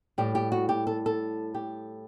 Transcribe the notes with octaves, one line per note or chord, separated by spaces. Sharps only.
A2 G3 G4
G4
F#4
G4
A4
A4
G4